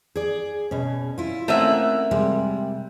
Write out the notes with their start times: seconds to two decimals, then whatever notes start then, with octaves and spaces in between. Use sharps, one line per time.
0.16 G#4 D5
0.71 B2 C#4
1.18 E4 F4
1.48 A3 A#3 C4 C#4 E5 F#5
2.11 C3 G3 G#3